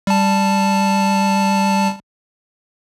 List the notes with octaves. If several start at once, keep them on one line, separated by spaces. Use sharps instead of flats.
G3 A5